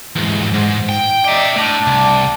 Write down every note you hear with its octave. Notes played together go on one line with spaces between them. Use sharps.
E2 G#2
G#2
G5
D#4 D5 E5 G5
A2 D4
C2